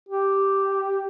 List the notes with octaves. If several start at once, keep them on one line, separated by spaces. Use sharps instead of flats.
G4